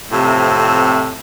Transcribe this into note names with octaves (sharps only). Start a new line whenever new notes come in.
F2 A2 C3